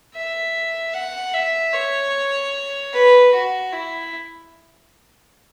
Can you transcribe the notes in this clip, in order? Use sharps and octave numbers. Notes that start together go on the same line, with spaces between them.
E5
F#5
E5
C#5
B4
F#4
E4